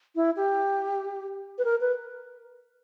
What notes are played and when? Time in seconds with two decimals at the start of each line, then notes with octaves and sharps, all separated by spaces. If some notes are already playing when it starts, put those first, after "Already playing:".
0.16 E4
0.36 G4
1.58 B4
1.65 A#4
1.81 B4